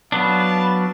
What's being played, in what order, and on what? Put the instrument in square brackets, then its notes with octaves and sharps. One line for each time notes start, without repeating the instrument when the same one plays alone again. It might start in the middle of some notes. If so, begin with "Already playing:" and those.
[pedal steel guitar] F#3 B3 D4 [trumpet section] F5 A5 [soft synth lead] B5